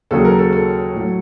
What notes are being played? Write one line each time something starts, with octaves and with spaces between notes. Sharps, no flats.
D#2 C#3 F#3 A4
A#4
A4
A4
A2 F#3